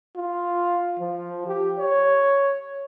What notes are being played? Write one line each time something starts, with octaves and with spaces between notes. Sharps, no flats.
F4
F3
G4
C#5